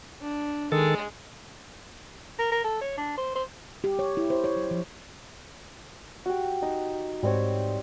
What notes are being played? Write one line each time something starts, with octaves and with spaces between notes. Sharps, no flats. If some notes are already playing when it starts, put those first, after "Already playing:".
D4
D#3 G#3 A4
A#4
A#4
A4
C#5
D4
C5
C5
G4
C#5
E4
C5
C#5
F#3
F3
F#4 G4
D#4
G#2 G3 C4 C#5